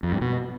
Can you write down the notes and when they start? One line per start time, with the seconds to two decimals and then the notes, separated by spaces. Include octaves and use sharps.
0.03 F2
0.12 G2
0.21 B2